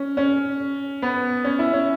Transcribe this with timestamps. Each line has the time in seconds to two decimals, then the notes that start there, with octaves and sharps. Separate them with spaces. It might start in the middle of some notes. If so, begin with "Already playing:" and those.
Already playing: C#4
0.17 C#4
1.02 B3
1.44 C#4
1.59 E4
1.73 C#4